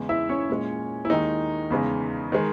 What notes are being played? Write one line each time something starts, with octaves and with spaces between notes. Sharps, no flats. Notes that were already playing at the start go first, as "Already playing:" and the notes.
Already playing: E2 C#3 G#3
E4 E5
C#4 C#5
A#2 G#3
E4
D#2 D#3 G#3 D#4
E2 C#3 G#3
D#3 G#3